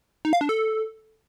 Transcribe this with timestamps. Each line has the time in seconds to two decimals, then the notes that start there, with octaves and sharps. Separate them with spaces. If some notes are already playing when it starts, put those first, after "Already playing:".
0.25 D#4
0.33 F5
0.41 D4
0.49 A4